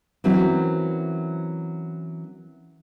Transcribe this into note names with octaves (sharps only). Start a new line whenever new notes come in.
E3 F#3 A#3 C4 C#4 E4